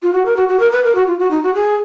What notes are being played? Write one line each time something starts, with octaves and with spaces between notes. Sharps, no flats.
F4
F#4
A#4
F#4
F#4
A#4
B4
A#4
F#4
F4
F#4
D#4
F#4
G#4